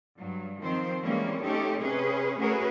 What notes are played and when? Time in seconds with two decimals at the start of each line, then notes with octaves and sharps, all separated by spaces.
0.19 G2 F#3
0.61 D#3 F3 C4 C5
1.03 E3 G3 G#3 A#3 C4 C#4
1.42 A3 C4 C#4 D#4 G4 A4
1.81 C3 C#4 G#4 B4
2.39 A3 C#4 F#4 G#4 A#4 B4